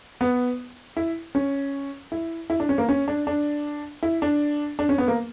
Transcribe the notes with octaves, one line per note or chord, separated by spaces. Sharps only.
B3
E4
C#4
E4
E4
D4
C#4
A#3
C#4
D4
D4
E4
D4
D4
C#4
B3
A#3